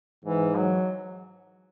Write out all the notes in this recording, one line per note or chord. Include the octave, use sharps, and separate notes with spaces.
G#2 E3
F#3